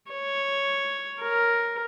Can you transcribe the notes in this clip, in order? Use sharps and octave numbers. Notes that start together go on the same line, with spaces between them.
C#5
A#4